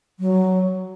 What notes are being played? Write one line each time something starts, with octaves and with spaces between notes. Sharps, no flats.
F#3